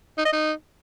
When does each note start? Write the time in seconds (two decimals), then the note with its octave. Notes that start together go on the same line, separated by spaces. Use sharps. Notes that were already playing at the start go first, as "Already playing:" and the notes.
0.18 D#4
0.25 D#5
0.33 D#4